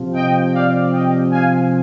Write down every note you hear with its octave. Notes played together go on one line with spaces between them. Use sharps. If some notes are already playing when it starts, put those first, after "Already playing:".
Already playing: C3 F3
D#5 G5
D5 F5
D#5 G5
F5 G#5